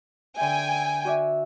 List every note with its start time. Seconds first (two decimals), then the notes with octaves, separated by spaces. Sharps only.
0.36 D3 E5 G5 G#5
1.05 F#4 D5 E5